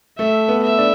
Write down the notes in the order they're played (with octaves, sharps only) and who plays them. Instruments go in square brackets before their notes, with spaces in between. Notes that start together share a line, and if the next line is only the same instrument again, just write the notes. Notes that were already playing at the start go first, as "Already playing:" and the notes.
[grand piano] A3 [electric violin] E5
[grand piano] B3
[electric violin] E5
[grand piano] D4